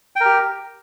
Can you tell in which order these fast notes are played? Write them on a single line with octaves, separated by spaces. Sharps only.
G5 A#4 G4